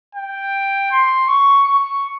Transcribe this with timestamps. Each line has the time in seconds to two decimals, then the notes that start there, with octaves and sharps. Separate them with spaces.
0.15 G5
0.91 C6
1.28 C#6
1.66 C#6